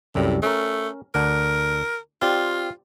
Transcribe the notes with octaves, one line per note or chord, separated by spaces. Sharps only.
C2 F#2 A2 G3
A3 C#4 A#4
D2 D4 A#4 F#5
C4 F4 G4 D5